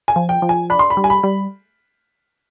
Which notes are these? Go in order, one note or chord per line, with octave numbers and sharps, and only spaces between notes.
G#5
F3
G5
F3
G#5
D4 B5
C6
B5
G3
G#5
B5
G3